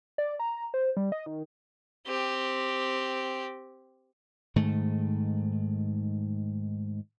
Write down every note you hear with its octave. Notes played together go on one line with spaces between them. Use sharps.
D5
A#5
C5
G3
D#5
D#3
C4 G4
G#2 D#3 A3